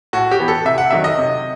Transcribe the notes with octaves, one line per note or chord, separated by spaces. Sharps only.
A2 F#4
G4
E3 B3
A4
C3 E5
F#5
D#3 F#3 A3 E5
D#5
C3